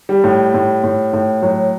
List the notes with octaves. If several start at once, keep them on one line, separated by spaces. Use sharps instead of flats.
G3
A2
A2
A2
A2
A2 F#3